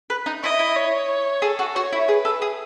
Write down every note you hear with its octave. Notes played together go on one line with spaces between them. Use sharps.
B4
D#4
E4 D#5
E4
C#5
G#4 A4
F#4
F#4 C#5
E4
G#4 B4
A4
G#4